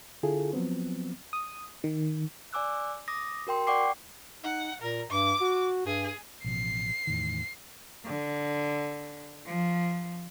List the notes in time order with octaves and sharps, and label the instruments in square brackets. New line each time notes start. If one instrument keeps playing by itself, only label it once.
[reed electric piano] D3 E4 F4 G#4 A4
F3 F#3 B3 C4
[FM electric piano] D#6
D#3
[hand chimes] D5 G#5 D6 E6 F#6
D6 D#6 A#6
F#4 A#4 G5 C6
D5 F#5 G5 C#6 D6 C7
[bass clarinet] D#4 [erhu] F#5
[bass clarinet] A#2 [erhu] A#4
[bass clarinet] G2 [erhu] D6
[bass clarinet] F#4
[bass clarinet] G2 [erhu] G#4
[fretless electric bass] A1 B2 F3 [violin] C7
[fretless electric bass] E2 A2 D#3
[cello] D3
F3